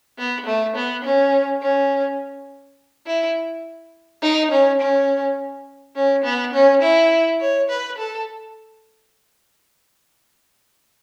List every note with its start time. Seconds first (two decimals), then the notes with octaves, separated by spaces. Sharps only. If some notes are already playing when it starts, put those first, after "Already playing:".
0.18 B3
0.46 A3
0.76 B3
1.04 C#4
1.62 C#4
3.06 E4
4.22 D#4
4.51 C#4
4.80 C#4
5.95 C#4
6.24 B3
6.54 C#4
6.82 E4
7.41 C#5
7.70 B4
7.98 A4